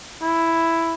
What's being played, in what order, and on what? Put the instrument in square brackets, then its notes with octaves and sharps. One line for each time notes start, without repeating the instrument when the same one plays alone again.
[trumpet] E4